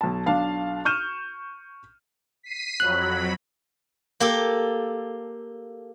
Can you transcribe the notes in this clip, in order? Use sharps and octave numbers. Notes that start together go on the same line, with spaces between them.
B1 A5
B1 D4 F5 A5
C#6 F6 G6 D#7 E7
B6 C7 D#7
F2 F#3 B5 F#6
A#3 G4 A4